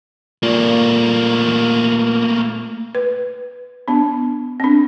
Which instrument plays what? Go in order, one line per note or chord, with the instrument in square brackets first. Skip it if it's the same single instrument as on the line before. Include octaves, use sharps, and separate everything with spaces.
[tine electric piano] A#2 [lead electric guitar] A3 A#3
[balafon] B4
B3 D4
C4 D4